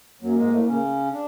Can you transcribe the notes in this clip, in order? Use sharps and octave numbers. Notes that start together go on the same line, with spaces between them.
F#2 F#3 A#3
G#2 G#3
A2 A3
C#3 C#4
D4